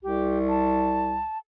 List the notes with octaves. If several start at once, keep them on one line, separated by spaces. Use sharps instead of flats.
C2 G4
A5